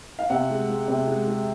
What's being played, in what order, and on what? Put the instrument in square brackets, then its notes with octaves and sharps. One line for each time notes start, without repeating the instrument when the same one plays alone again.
[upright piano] F5
C3 F#5
G#3
G#3
C3
G#3
G#3